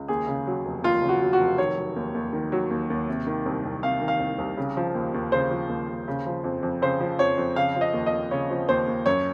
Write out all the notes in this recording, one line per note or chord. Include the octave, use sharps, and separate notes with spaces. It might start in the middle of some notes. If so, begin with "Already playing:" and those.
Already playing: C#2
D#2 G#4
C#3
F#3
F1
D#2 F4
C#3
F#4
F#3
F#4
F1
D#3 C#5
F#3
D#2
D#2
D#3
F#3
D#2
D#2
C3
D#3
C2
C2
C3 F5
D#3
F5
C2
C2
C#3
F3
D#2
D#2
C#3 C5
F3
D#2
D#2
C#3
F3
F2
F2
C#3 C5
F3
F2 C#5
F2
C#3 F5
F3
D#5
D#2
D#5
D#2
C#3 C#5
F3
D#2 C5
D#2
F#2 C#5